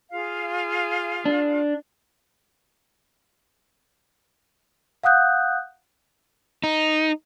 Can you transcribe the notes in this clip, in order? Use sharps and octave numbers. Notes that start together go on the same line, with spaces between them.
F4 G#4 F5
D4
F5 F#5 D#6 F#6 G6
D#4